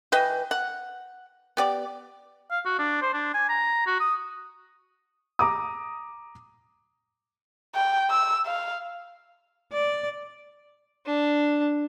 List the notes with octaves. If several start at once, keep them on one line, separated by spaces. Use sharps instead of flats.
E3 B4 D#5 G5
F#5
B3 G4 D5
F5
F#4
D4
C5
D4
G#5
A#5
F#4
D#6
A#5 D6 D#6
G5
E6
F5
D5
D4